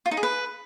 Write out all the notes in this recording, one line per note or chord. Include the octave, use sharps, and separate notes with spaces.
F4
D#4
G#4
B4